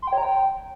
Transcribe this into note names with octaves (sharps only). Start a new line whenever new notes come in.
C6
G5
C#5
A#5
G5